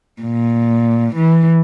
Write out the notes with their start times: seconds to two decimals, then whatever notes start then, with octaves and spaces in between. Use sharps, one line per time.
0.22 A#2
1.16 E3